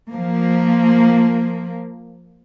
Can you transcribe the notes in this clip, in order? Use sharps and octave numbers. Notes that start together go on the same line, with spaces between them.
F3 A#3